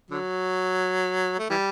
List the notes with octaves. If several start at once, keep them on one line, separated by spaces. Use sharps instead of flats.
D3 F#3
A3
E3 G3